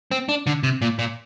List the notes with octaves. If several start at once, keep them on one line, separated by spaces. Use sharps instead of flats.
C4
D4
D3
C3
A#2
A#2